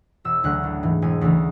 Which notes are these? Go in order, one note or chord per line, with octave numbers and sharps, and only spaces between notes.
E1 E6
D2 D3 F#3 F#6
A1
G#2 E3
E1 G#5
D2 C#3 E3